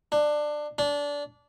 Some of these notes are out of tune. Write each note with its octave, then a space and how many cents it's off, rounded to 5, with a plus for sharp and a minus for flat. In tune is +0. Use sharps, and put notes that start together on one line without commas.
D4 +20
D4 -20